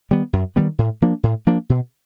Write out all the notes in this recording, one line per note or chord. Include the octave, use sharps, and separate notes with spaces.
D#3 G3 B3
F#2
D#3 G3 B3
A2
F3 A#3 D4
A2
F3 A#3 D4
B2